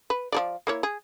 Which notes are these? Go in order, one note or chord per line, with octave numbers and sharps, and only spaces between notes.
B4
F3 G#4 D5
A#3 E4 C#5
G#4